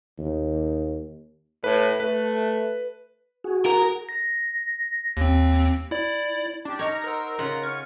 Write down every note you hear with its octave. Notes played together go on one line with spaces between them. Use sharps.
D#2
A2 B4
A3 B4
F#4 G#4
A#4
A#6
D#2 C4
E4 D5
D4 G4 A5 D6
D#4 A#4 C#5 D#5 A#5
A#4 C5 F#5 E6
C#3 F4 C#5 F#5
C#4 C#6 F6